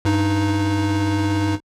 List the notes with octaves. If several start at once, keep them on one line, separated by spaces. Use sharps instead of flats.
G2 D#4